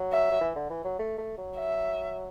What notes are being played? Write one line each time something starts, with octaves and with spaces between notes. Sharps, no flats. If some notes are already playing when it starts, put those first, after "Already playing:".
Already playing: F#3
E5
F#3
E3
D3
E3
F#3
A3
A3
F#3
E5